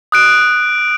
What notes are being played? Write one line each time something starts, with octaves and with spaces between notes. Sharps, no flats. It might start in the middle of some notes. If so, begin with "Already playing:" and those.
D#6 F#6 D7